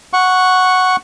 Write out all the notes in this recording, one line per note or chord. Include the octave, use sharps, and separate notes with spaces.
F#5 C#6